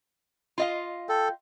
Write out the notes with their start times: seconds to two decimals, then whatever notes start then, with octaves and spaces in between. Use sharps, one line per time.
0.58 F4 D#5 F5
1.09 A4 G5